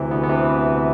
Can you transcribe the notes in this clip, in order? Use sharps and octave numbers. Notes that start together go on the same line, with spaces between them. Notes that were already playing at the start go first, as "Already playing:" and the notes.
Already playing: D2 C3 E3 C4
D2 B3
B3
C3 E3